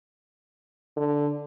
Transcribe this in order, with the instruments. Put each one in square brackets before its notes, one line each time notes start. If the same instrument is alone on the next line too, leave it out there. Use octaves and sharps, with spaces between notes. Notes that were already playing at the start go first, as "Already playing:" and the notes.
[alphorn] D3